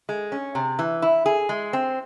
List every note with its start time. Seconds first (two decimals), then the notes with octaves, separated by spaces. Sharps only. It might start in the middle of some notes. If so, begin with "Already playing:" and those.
0.09 G#3
0.32 C#4
0.55 C3
0.79 E3
1.02 E4
1.26 G#4
1.49 G#3
1.73 C4